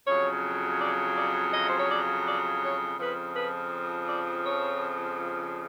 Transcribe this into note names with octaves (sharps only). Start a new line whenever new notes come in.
F2 C#3 F#3 C#5
D5
D5
D#5
C5
C#5
D5
D5
C#5
F2 C#3 F3 B4
B4
D5
C#5